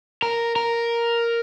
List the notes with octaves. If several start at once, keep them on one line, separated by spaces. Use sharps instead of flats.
A#4
A#4